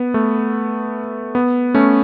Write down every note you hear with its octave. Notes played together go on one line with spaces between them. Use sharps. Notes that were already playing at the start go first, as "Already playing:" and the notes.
Already playing: B3
A3
B3
A3 C#4